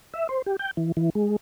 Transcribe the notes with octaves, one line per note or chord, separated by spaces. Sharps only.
E5
C5
G4
G5
E3
E3
G#3